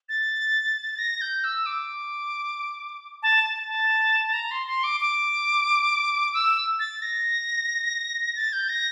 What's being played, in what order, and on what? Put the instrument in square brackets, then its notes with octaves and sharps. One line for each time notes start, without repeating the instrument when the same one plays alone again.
[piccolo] A6
A#6
G6
E6
D6
A5
A5
A5
A#5
C6
C6
D6
D6
E6
A6
A#6
A6
G6
A#6